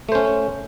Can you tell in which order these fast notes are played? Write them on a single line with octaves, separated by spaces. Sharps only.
A3 C5 C#4